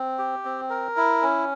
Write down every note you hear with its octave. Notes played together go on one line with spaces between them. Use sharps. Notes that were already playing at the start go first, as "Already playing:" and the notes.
Already playing: C4
G4
C4
A#4
E4
C#4